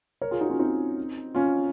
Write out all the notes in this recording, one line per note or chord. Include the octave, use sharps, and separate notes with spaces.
A#4 C#5
F4 G#4
D#4 F#4
C#4 F4
C4 D#4
C#4 F4